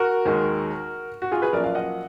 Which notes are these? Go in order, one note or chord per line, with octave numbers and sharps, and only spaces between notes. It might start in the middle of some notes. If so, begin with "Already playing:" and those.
Already playing: F#4 A#4
D#2 D#3 G#3
F#4
F4 G#4
G#4 B4
F#2 F3 A#3 A#4 D5
D5 F5
D#5 F#5